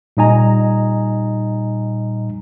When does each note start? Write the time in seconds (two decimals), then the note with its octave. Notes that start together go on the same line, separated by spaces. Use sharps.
0.17 A#2 G3 D#4 D#5 G#5 A#5